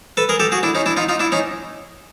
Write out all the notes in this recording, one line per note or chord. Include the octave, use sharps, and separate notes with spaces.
A4 B4
G#4 A#4
G4 A4
F#4 G#4
D4 E4
C#4 D#4
D4 E4
D#4 F4
D#4 F4
D4 E4
C#4 D#4